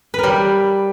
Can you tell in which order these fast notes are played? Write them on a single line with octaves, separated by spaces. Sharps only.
B4 A#4 G3